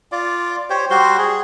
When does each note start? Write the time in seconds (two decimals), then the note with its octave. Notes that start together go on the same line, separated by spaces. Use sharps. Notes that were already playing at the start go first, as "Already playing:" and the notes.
0.12 F4 D5
0.70 G4 C5 C#5
0.90 G3 F#4 C5 C6
1.18 G#4